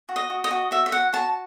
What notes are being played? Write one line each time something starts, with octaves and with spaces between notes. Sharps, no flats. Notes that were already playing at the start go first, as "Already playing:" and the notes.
F#4
D#5
F#4
D#5
F#4
F#4 E5
E5
F#4 F#5
F#4 A5